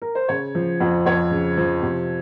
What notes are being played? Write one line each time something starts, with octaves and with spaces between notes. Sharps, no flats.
A#4
C5
C#3 C#5
F3
F2
F2 C#5
C#3
F3
C3